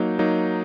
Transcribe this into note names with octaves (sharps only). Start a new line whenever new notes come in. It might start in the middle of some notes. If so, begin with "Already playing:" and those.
Already playing: F#3 A#3 D#4
F#3 A#3 D#4